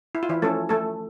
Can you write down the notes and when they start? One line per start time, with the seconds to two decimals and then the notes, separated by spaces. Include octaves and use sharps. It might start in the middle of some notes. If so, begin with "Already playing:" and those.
0.15 E4
0.23 F4
0.29 E3 E4
0.42 F3 A3 C#4 A4
0.69 A3 A4